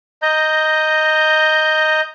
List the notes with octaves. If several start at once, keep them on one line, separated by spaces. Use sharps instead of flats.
D#5 A#5 G6